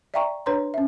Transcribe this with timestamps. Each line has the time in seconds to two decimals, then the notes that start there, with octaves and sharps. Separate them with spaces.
0.14 D5 E5 F5 G5 A#5 C#6
0.46 D4 B4 C#5 A#5 C6
0.74 C#4 E5